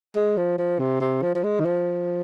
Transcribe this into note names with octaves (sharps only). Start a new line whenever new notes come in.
G#3
F3
F3
C3
C3
F3
F3
G#3
D#3
F3